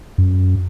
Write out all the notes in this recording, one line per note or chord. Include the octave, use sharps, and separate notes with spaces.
F#2